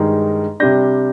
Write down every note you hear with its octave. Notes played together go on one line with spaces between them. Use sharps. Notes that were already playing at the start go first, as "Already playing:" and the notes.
Already playing: G2 D#3 G#3 D#4
C3 G3 D4 G6 A#6